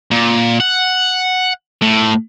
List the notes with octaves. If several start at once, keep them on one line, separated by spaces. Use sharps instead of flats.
A#2
F#5
A2